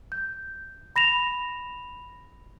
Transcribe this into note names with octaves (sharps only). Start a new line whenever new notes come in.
G6
B5 A#6 E7 F7